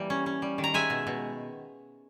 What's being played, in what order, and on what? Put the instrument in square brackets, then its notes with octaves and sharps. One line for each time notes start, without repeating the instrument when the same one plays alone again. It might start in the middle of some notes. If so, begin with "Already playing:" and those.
Already playing: [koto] E3 G3 A#3
C#4
C#4
G3
D#3
A#5
G#3 E5 G#5
B2
B2